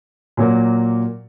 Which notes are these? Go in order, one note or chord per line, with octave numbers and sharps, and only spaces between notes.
A#2 F#3 A#3